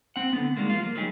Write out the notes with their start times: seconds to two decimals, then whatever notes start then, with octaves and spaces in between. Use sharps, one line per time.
0.16 C4 F#5
0.33 D3 B3
0.57 D#3 G3 G#3 A#3
0.70 F3 F4
0.83 A#3
0.96 F#3 G3 D#4 G4 G#4